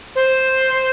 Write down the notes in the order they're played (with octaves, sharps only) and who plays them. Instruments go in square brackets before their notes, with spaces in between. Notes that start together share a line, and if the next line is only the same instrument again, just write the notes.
[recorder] C5